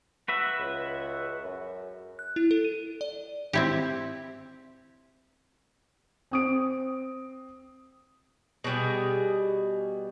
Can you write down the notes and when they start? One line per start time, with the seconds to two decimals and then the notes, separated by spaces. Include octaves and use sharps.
0.28 F#4 B4 E5
0.59 C#2
1.44 F#2
2.19 F#6
2.36 E4
2.51 A4
2.64 D#7
3.01 D5
3.53 C4 E4 G4
6.31 C4 D#6 D7
8.64 B2 G3 G#4